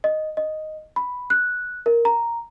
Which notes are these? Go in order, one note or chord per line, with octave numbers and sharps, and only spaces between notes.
D#5
D#5
B5
F#6
A#4
A#5